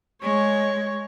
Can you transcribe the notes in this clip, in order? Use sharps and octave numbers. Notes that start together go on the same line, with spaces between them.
G#3 C#5